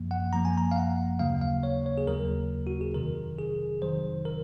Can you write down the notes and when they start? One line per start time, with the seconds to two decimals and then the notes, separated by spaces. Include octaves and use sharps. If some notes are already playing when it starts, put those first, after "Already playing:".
Already playing: F#2 F3 A#3
0.11 F#5
0.33 F#2 F3 A#3 A#5
0.45 G#5
0.58 A#5
0.72 F5
0.76 F#5
1.19 D#2 C#3 F#3 A#3 F5
1.41 F5
1.63 C#5
1.86 C#5
1.98 G#4
2.07 D#2 C#3 F#3 A#3 A#4
2.67 F#4
2.81 G#4
2.94 F2 C3 D#3 F#3 A#4
3.38 G#4
3.82 F2 C3 D#3 F#3 C5
4.25 A#4